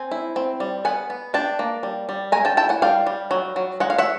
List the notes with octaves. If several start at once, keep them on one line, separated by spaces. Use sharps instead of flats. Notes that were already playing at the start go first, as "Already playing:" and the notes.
Already playing: C4 G#5
E4
C4
G3
B3 F#5 G#5
B3
D4 G5 A5
A#3
G3
G3
G#3 G#5 A#5
G5 A5
E4 G5 A5
F#5 G#5
G3 F5 G5
G3
F#3
F#3
G#3 F#5
F5
E5 F#5